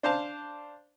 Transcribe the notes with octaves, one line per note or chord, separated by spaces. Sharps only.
D4 C5 F5 A5